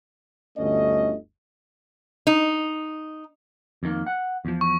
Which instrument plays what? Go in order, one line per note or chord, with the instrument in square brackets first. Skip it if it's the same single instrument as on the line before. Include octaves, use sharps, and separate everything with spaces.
[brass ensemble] G1 D2 A3 C#4 D#5
[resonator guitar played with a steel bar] D#4
[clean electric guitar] F2 D#3 A#3
F#5
E2 F3
[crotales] C#6